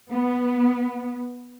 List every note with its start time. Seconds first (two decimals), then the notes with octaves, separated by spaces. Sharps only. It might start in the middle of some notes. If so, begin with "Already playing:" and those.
0.11 B3